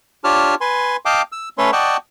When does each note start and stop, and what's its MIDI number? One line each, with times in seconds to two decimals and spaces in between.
0.24 0.55 62
0.24 0.55 65
0.24 0.55 67
0.24 0.55 73
0.24 0.55 81
0.24 0.55 89
0.61 0.97 71
0.61 0.97 80
0.61 0.97 84
1.05 1.22 75
1.05 1.22 77
1.05 1.22 79
1.05 1.22 81
1.05 1.22 86
1.32 1.49 88
1.58 1.71 57
1.58 1.71 61
1.58 1.71 69
1.58 1.71 71
1.58 1.71 73
1.58 1.71 84
1.72 1.97 74
1.72 1.97 75
1.72 1.97 78
1.72 1.97 79
1.72 1.97 81
1.72 1.97 85